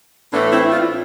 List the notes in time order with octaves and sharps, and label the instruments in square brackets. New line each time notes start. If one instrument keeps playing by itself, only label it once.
[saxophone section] A2 E3 A3 B3 D4
C4 E4
D4 F4